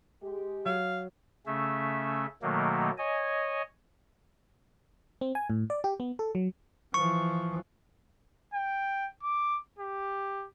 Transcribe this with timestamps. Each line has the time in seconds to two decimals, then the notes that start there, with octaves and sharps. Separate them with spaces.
0.22 G#3 G4
0.66 F#3 F5
1.46 C#3 A3 C#4 E5
2.42 B2 D#3 F#3 A3 A#3
2.98 C#5 D#5 G#5
5.21 C4
5.35 G#5
5.50 A2
5.70 D5
5.84 G4
6.00 B3
6.19 A4
6.35 F#3
6.94 E3 F3 C#6
8.54 G5
9.23 D6
9.79 G4